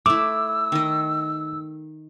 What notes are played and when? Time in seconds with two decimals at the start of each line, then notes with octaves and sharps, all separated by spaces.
0.06 A3 E4 D6 E6
0.72 D#3 D#5